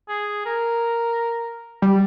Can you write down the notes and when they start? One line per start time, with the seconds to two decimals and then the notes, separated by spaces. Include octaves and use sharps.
0.09 G#4
0.46 A#4
1.82 G3